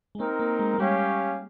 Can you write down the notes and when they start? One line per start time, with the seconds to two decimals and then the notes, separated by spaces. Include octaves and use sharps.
0.15 G#3
0.19 A#3 C4 D#4 A#4
0.40 A#3
0.59 G#3
0.74 G#3
0.79 G3 C#4 G4 C#5 F5